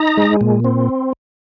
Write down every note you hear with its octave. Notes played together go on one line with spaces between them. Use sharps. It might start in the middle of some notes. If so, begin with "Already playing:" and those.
Already playing: D#4 A#5
G#3
A#2
C4